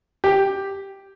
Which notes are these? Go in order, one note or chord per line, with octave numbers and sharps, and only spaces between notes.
G4